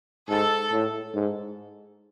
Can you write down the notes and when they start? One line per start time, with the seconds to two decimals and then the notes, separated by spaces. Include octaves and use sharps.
0.29 G#2 A4
0.72 A2
1.14 G#2